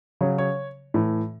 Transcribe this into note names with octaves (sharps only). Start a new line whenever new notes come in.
C#3 F#3 C#5
C#5
A2 E3